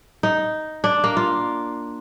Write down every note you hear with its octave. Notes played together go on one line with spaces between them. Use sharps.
D#4
D4
A#3
F4